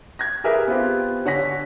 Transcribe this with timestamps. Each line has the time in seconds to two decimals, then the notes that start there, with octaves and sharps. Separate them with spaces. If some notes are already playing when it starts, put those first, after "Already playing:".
0.19 G#6 A#6
0.44 G4 G#4 A#4 B4 E5
0.68 B3 C4 F4 G4
1.25 D3 C#5 F#5 G#5 A#6 B6